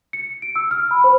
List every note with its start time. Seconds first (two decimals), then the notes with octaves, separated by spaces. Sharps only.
0.13 C#7
0.42 D7
0.56 E6
0.71 F6
0.91 B5
1.04 C5